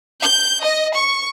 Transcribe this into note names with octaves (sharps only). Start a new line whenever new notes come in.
G6
D#5
C#6